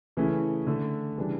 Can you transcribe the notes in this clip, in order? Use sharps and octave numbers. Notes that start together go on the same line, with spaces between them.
C#3 E3 A3 C#4 E4
D3 A3 D4
C#3 E3 G3 D4